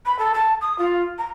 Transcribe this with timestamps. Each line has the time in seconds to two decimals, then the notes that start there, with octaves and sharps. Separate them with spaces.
0.05 B5
0.19 A4
0.34 A5
0.61 D#6
0.79 F4
1.18 A#5